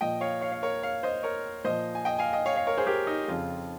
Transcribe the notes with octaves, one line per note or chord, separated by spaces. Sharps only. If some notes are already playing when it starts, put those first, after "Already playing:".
A#2 F3 D#5 G5
C#5 F5
C#5 F5
C#5 F5
A#4 C#5
C#5 F5
C5 D#5
A#4 C#5
A#2 F3 C5 D#5
G#5
D#5 G5
F5 G#5
D#5 G5
C#5 F5
C#5 F5
A#4 C#5
G#4 C5
G4 A#4
D#4
F2 C#3 F3 F4